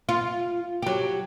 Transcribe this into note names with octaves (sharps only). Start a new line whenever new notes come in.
F4
F#3 G4